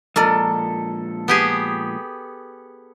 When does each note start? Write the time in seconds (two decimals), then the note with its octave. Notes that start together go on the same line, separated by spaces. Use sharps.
0.16 A#2 F3 G#3 A4 A#4 D5 D#5
1.28 B3 G4 G#4